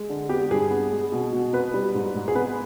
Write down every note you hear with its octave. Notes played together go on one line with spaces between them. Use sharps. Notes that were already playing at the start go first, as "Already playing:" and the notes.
Already playing: G#3
D3
B3 G4
G2 G#4
B3
G#3
B2
B2
B3 B4
G3
G#2
G#2
G#4
B3 B4